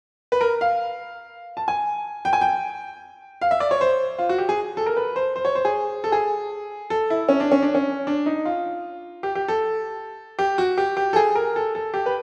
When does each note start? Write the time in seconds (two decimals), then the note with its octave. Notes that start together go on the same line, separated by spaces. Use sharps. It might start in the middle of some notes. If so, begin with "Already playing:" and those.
0.32 B4
0.41 A#4
0.61 F5
1.57 A5
1.68 G#5
2.25 G5
2.33 G#5
2.41 G5
3.41 F5
3.51 E5
3.60 D5
3.71 C#5
3.81 C5
4.19 F4
4.29 F#4
4.38 G4
4.49 G#4
4.77 A4
4.86 A#4
4.97 B4
5.16 C5
5.36 C5
5.45 C#5
5.55 C5
5.65 G#4
6.04 A4
6.12 G#4
6.90 A4
7.10 E4
7.29 C#4
7.40 D4
7.51 C#4
7.62 D4
7.75 C#4
8.07 D4
8.26 D#4
8.45 F4
9.23 G4
9.35 G4
9.48 A4
10.39 G4
10.58 F#4
10.78 G4
10.97 G4
11.13 A4
11.16 G#4
11.35 A#4
11.56 A4
11.75 A4
11.94 G4
12.06 B4